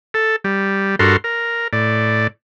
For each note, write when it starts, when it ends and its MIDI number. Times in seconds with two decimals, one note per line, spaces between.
0.14 0.36 69
0.44 0.96 55
0.99 1.17 43
0.99 1.17 66
0.99 1.17 69
0.99 1.17 70
0.99 1.17 84
1.24 1.68 70
1.73 2.27 45
1.73 2.27 74